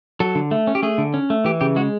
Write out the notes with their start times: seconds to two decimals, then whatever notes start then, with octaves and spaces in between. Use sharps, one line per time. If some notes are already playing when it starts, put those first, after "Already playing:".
0.20 F#3 A4
0.35 D3
0.51 A3
0.67 C#4
0.75 G4
0.83 A3 G#4
0.98 D3
1.14 C#4
1.30 A3
1.45 E3 G4
1.61 C#3 G4
1.76 G#3 F#4